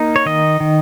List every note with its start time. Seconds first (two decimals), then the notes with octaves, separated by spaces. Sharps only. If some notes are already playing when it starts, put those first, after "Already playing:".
Already playing: A#3 D#4
0.16 C#5
0.26 D#3 D#5
0.60 D#3